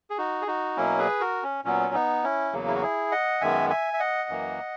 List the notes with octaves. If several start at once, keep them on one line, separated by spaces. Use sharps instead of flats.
G#4
D#4 F#4
G#4
D#4 F#4
B2 F#3 A#3 C#4 E4
G#4 B4
F#4 A#4
C#4
A#2 F#3 B3 C#4
B3 D#4
C#4 E4
E2 C#3 F#3 A#3
E4
F#4
E4 G#4
D#5 F#5
F#2 D#3 G#3 B3 E5 G#5
E5 G#5
E5
D#5 F#5
F#2 E3 A#3